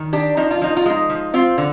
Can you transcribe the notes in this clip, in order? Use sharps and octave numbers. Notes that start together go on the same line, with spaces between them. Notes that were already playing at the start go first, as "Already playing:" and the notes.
Already playing: D#3
D4 G4
F3 D#4
F4
F3 D#4
F4
G#3 D#4
F3
C4 F4
D3